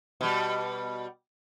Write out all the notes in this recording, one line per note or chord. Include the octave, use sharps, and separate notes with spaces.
B2 G3